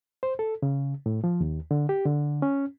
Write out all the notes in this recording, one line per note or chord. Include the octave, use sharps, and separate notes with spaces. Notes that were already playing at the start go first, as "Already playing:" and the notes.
C5
A4
C#3
A2
F3
D#2
D3
G4
D3
C#4